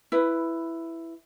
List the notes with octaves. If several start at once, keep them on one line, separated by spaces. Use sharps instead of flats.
E4 B4